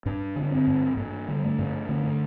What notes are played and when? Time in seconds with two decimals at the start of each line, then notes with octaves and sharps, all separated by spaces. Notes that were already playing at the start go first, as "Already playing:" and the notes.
0.06 G2 D4
0.36 D3
0.43 D4
0.51 C4
0.67 G2
0.97 G2 A#3
1.28 D3 G3
1.44 A3
1.59 G2
1.89 D3 A3